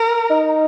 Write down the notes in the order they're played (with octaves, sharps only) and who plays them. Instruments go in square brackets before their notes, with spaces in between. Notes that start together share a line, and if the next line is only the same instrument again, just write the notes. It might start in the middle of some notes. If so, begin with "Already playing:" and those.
Already playing: [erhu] A#4
[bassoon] D#4